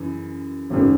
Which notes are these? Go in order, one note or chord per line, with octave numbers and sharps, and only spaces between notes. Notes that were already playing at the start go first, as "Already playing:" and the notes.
Already playing: F#2 C#3 E3
G#1 F#2 C#3